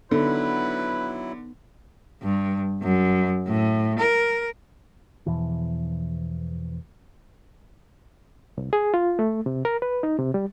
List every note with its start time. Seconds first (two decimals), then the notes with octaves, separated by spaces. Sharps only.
0.11 D3 F#3 B3 D#4 E4 B4
2.23 G2
2.82 F#2
3.47 A2
3.99 A#4
5.26 E2 B2 E3 F3
8.58 C2
8.73 G#4
8.94 F4
9.19 A3
9.46 C3
9.65 A#4
9.82 B4
10.03 D#4
10.19 C3
10.34 G3